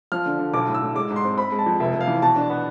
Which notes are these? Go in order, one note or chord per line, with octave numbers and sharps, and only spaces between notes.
F3 F6
D3
D3
B1 D6
A2
E6
A2
G#3 D6
G#2
C6
C4
C4 B5
G#3
A5
F2
F1 E5
F1
F5
E3
B2 A5
D4
B3